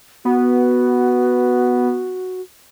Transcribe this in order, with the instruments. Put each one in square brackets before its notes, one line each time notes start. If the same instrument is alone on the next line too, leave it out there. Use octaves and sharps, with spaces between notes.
[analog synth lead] B3 [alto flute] F#4